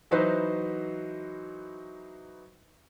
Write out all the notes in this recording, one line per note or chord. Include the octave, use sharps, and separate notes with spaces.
E3 F#3 D#4 F#4 B4 C5